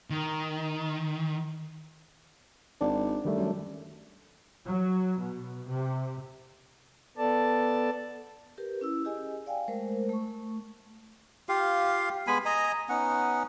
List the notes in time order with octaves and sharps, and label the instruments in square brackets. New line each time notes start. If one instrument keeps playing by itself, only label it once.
[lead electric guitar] D#3
[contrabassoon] G#1 [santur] D4
[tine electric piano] D#3 G3 A3
[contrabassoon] F#2
[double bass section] F#3
B2
C3
[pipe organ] B3 A4 D5 A5
[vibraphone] G4 A#4 B4
C#4 E4 E6
G4 G#4 D#5 G#5
D5 F5 G5 G#5
G#3 A3 A#4 C5
A3 C#6
[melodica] F4 G4 F5
G#3 B3 G#5 B5
D#5 G#5 A#5
B3 C#4 D#4 F#5